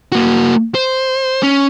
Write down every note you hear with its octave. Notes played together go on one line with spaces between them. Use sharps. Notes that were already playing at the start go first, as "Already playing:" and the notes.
A#3 F#4
C5
C#4